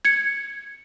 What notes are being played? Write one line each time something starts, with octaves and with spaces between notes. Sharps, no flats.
G#6 C#7